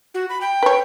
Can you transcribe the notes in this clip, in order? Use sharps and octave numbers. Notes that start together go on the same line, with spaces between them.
F#4
B5
G5
B4 C#5